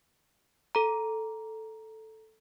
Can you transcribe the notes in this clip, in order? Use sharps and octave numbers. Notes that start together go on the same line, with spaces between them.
A4 A#5